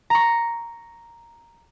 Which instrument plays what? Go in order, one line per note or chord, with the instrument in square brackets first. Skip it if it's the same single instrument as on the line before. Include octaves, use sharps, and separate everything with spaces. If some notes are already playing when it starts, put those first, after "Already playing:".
[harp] A#5 C#6